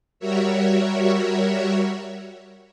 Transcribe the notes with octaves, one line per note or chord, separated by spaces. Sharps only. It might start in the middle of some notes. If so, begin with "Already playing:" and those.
G3 F#4 A#4 C#5 E5